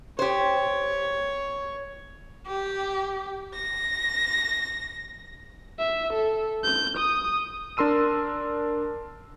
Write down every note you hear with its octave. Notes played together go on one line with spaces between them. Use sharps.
G4 C5 C#5
G4
A#6
E5
A4
G6
D#6
D4 A#4 C6 E6 D#7